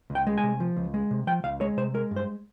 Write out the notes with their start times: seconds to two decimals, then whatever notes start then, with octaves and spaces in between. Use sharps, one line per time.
0.10 C#2
0.15 G5
0.27 G#3
0.38 G#5
0.44 C3
0.60 F3
0.76 C#2
0.94 G#3
1.11 C3
1.27 F3 G5
1.44 C#2 F5
1.61 G#3 C#5
1.77 C3 C5
1.94 G#3 A#4
2.11 G2
2.16 C5